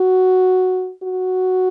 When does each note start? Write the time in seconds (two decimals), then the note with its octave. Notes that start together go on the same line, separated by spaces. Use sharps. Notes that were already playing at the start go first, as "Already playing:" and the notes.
Already playing: F#4
1.03 F#4